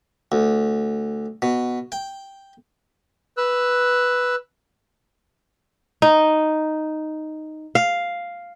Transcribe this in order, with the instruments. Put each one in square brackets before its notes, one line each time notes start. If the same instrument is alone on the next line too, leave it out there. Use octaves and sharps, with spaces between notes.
[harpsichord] D2
B2
G5
[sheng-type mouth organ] B4 E6 F#6
[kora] D#4
F5